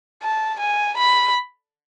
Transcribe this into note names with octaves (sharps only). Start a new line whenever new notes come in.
A5
G#5
B5